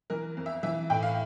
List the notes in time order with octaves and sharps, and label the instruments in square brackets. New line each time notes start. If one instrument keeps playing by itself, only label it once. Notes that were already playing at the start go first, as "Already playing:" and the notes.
[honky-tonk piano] E3 A#4
F2
E5
E3 E5
A2 G5
F5